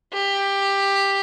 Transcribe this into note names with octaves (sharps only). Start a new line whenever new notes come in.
G4